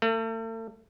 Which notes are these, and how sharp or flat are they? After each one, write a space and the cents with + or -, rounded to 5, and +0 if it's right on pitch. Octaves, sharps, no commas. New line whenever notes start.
A3 +40